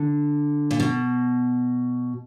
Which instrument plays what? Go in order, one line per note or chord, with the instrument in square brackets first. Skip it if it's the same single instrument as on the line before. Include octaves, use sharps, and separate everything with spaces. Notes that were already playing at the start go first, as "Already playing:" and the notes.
Already playing: [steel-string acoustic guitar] D3
A#2
B2